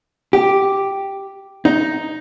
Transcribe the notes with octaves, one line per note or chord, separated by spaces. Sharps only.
G4
D#4